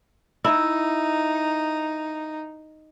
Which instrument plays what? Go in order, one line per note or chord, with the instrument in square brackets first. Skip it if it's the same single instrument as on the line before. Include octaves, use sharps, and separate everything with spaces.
[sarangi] D#4 [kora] E4 [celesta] E5